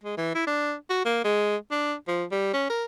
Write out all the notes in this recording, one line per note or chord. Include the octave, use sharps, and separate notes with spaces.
G#3
E3
E4
D4
F#4
A#3
G#3
D4
F3
G3
C#4
A#4